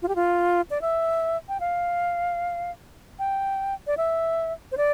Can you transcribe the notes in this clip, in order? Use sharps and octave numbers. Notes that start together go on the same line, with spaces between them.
F4
G4
F4
D5
E5
G5
F5
G5
D5
E5
C5
D5